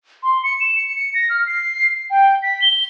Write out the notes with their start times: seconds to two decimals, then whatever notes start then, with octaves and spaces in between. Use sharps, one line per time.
0.23 C6
0.43 C#7
0.61 E7
0.76 C#7
0.96 C#7
1.14 A#6
1.30 F6
1.46 C7
2.10 G5
2.43 B6
2.62 G7